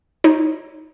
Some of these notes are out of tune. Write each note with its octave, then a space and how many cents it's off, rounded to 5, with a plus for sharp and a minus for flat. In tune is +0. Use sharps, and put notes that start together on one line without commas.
D#4 +10 C#5 -25